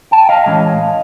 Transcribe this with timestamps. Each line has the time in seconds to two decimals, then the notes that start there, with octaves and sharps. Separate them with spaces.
0.11 G5 A5
0.29 D#5 F5
0.46 A2 E3 G#3 C#4